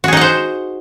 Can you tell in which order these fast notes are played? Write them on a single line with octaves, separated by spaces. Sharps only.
F#4 G#4 D#4 F#5 C5